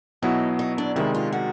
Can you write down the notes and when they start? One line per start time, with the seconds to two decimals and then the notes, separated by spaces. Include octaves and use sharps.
0.22 B2 F#3 B3 D#4 E4
0.59 D#4
0.78 D4
0.96 C3 D#3 G#3 E4
1.15 F4
1.32 F#4